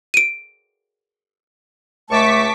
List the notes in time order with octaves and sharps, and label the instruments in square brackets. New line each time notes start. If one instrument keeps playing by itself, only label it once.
[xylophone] D7 D#7
[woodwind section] C#2 A3 A5 [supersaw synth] C#6 D6 B6